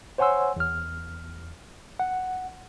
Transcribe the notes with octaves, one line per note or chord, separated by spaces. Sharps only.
C5 C#5 F#5 G#5 C6 E6
E2 F6
F#5